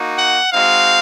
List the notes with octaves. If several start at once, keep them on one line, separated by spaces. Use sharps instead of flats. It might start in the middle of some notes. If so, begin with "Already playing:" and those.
Already playing: A#3 D#4 F#4
F#5
G#3 C4 D#4 F#4 F5